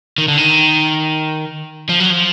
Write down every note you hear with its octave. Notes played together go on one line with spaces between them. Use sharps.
D#3
D3
D#3
F3
F#3
F3